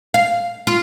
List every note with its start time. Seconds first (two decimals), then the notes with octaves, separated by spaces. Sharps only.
0.14 F5
0.67 F4